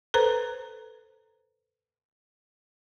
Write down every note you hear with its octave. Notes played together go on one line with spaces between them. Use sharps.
A4 B4 C5 A#5